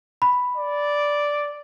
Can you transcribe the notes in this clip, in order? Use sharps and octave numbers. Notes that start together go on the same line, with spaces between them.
B5
D5